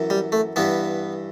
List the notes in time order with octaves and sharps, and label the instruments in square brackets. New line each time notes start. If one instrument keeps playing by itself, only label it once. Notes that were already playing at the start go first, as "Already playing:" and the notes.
Already playing: [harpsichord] F#2 E3
G3
A3
G2 E3 B3